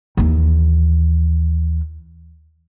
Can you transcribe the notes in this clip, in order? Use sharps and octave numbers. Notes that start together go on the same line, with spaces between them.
D#2 E3